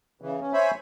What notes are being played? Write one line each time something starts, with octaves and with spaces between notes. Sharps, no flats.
C#3 E3
C#4
C5 C#5 E5 G#5 B5